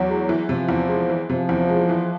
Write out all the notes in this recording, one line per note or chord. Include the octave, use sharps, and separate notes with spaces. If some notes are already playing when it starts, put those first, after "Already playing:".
Already playing: E2 F#3
G#3
E3
C3 F3
E2
G#3
E3
C3 F3
E2
G#3
E3